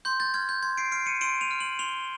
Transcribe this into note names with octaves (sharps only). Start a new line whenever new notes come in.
C6 G6
G6 A6
F6 G#6
G6
C6 G#6
C7 D7
F6 C7 D7
C#7 D#7
C6 D7 E7
D#7 F7
F6
E7 F#7
C6 F7 G7